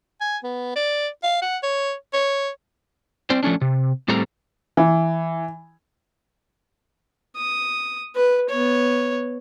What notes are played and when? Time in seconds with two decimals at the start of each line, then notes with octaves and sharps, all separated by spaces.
0.21 G#5
0.43 B3
0.76 D5
1.23 F5
1.42 F#5
1.63 C#5
2.13 C#5
3.30 C4 C5 D5
3.43 F3 A3 C#4 D4
3.61 C3
4.08 A2 G3 A3 C4 A#5
4.77 E3
7.36 D#6
8.16 B4
8.49 B3 C#5